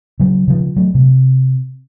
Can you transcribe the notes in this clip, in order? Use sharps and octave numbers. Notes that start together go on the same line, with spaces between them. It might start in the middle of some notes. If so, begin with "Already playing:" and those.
C#3 F#3
C#3 F3
F#3 A3
C3